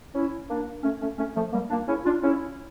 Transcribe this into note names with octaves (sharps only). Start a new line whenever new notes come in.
C#4 E4
A#3 D4
A3 C#4
A3 C#4
A3 C#4
F3 A3
G3 A#3
A#3 D4
C#4 E4
D4 F4
C#4 E4